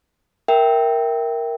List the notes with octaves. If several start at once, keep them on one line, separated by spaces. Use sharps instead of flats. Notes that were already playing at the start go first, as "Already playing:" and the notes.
A#4 E5 G5